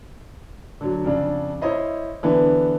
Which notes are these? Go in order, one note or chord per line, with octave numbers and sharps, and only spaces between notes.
D3 F#3
F2 C#3 D4
E4 C5 C#5 D#5 B5
D3 E3 B3